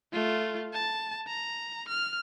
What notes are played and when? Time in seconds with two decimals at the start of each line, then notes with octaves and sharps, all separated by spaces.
0.13 A3 F4
0.73 A5
1.27 A#5
1.88 F6